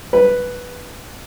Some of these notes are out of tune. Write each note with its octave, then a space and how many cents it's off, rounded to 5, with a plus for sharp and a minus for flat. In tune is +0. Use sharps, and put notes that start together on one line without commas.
B4 -5